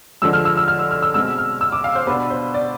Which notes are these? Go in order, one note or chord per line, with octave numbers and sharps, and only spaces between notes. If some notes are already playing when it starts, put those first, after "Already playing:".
D3 F3 G#3 E6
F6
E6
E6
F6
E6
F6
E6
B2 G#3 C4 E6
F6
E6
D6
F5
C5
B2 B3 D4 B4
C5
D5